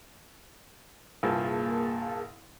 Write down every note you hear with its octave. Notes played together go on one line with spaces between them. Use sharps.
C2 G2 A#2 A#3 G#4 A5